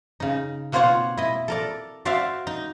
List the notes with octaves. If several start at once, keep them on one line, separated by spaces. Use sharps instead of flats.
C#3 D#4
B2 A#3 C4 F4 C#5 F#5
E4 D#5
A4 A#4 D5
F#4 C5 D5 E5 F5
D#4